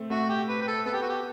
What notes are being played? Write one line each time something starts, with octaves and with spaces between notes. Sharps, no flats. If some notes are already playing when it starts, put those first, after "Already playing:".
Already playing: A3 C4
A3 F#4
G4
B4
B4
A4
B3 A4
G4
F#4
G4